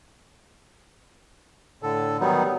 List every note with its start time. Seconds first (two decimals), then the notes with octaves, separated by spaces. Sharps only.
1.83 A2 D3 A4
2.20 D#3 F#3 G3 B3 D#4